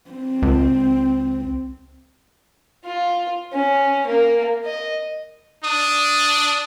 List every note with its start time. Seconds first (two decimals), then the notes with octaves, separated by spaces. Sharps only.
0.10 C4
0.42 C#2
2.85 F4
3.53 C#4
4.07 A#3
4.65 D#5
5.64 D4 D#6